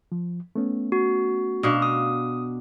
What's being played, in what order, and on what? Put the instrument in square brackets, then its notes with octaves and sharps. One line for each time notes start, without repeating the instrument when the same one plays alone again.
[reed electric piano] F3
A3 B3 C#4
[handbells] F#4
[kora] B2 D4 F5
[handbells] D#6